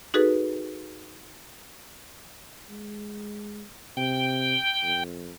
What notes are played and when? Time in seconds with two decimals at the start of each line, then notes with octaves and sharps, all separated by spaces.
0.14 D#4 F#4 G#4 A4 B4
2.70 G#3
3.97 C3 G5
4.83 F2